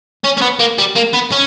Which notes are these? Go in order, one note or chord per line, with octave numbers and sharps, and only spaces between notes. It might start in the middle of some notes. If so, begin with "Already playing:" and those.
C#4
C#4
B3
A#3
G3
A#3
B3
C#4